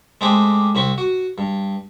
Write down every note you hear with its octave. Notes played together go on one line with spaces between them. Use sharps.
G#3 A3 C4 G4 G#4 D6
C2 C4 B5 C#6
F#4
G2